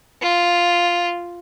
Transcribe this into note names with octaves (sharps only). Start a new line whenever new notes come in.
F4